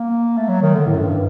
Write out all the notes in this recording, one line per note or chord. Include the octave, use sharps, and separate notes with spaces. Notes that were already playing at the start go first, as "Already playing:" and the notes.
Already playing: A#3
A3
F#3
D#3
D3
A2
F#2
G2